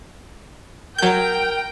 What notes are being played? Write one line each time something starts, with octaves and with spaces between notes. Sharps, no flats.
F#3 A#4 G5 G6